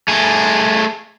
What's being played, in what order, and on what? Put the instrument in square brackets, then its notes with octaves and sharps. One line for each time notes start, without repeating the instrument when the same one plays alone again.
[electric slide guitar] A3 G#4